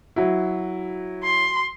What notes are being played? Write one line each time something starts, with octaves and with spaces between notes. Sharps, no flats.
F#3 E4 F#4
C6